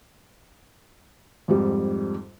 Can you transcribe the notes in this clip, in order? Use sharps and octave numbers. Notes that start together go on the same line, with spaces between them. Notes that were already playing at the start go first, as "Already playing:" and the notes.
F2 G#2 G3